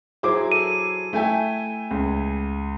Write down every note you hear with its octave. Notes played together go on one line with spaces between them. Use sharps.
F#3 E4 G#4 C5 D6
A4 D#7
A3 E4 E5 G5 G#5
C#2